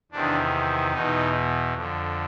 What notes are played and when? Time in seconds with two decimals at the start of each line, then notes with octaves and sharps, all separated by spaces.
0.11 E2 C3 D#3 D4
0.92 E2 B2 D#4
1.73 F2
1.78 D3